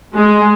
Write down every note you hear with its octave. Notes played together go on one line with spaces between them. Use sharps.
G#3